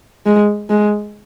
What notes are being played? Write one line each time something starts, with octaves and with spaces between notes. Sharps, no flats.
G#3
G#3